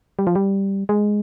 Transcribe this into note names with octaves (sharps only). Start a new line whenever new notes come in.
G3
F3
G3
G#3